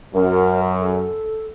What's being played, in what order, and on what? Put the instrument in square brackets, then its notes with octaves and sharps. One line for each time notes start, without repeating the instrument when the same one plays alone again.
[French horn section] F#2 [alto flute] A#4
[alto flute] A4